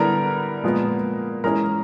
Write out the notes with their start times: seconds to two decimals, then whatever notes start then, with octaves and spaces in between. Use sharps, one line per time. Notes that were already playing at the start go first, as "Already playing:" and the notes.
Already playing: D3 G3 B3 E4 A#4 A#5
0.64 A#2 F3 G#3 B3
1.44 E3 G#3 C#4 E4 A#4 A#5